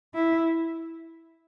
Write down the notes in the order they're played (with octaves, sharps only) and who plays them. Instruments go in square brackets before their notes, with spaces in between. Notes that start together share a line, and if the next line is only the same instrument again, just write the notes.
[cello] E4